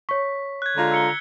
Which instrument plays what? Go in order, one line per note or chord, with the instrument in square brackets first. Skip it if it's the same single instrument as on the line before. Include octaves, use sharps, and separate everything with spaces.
[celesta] C#5 C#6 [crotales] B6
[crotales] F#6 G#6
[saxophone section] D3 G#3 F4 [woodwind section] A#5
[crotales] E6 C#7 G7